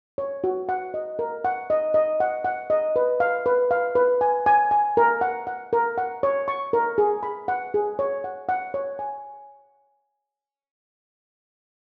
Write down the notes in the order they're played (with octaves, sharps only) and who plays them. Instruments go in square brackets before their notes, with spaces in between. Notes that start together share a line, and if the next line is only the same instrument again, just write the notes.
[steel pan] C#5
F#4
F#5
D#5
A#4
F#5
D#5
D#5
F#5
F#5
D#5
B4
F5
B4
F5
B4
G#5
G#5
G#5
A#4
F#5
F#5
A#4
F#5
C#5
C#6
A#4
G#4
B5
F#5
G#4
C#5
F#5
F#5
C#5
G#5